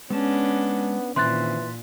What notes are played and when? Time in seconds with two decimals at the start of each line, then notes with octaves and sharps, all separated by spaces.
0.10 G#3 B3 C#4 D4 A5
1.16 A#2 D#3 E3 C4 C#4 C6 F#6 A6